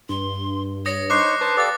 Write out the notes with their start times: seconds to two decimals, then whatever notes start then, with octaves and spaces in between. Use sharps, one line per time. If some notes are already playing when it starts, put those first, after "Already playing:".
0.09 G2 C6
0.86 C#5 D#6 A#6 C#7
1.10 D#4 C5 C#6 D6 F#6 C7
1.41 B4 C5 A5 D#6
1.57 G4 A4 D5 F5 D#6 A6